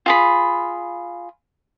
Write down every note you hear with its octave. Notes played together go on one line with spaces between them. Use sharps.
F4 G#4 B5